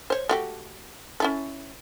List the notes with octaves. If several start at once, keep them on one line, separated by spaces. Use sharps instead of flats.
C5 C#5
A3 F#4 G4
C#4 E4 A4